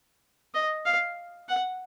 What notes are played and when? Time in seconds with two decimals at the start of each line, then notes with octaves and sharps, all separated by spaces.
0.55 D#5
0.86 F5
1.49 F#5